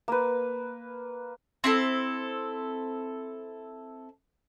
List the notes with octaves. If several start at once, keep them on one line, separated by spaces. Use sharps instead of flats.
A#3 B4
C4 E4 A4